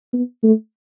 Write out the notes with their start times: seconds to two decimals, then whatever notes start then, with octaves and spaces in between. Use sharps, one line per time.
0.13 B3
0.43 A3